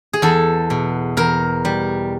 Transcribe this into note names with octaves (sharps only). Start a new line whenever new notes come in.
G#4
E2 A4
B2
E2 A#4
G3